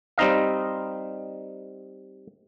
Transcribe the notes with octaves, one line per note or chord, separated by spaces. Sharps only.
G3 C4 D#4 D#5 F5